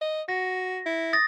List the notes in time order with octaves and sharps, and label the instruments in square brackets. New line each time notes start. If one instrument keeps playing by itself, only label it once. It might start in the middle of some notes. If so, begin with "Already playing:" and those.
[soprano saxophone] D#5
[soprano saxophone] F#4 [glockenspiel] A#6
[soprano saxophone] E4
[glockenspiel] D#6 A6 A#6